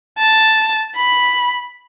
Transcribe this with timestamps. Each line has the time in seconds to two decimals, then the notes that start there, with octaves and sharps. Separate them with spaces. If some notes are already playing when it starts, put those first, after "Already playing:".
0.18 A5
0.96 B5